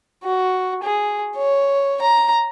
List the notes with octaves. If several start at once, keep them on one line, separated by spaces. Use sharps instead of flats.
F#4
G#4
C#5
A#5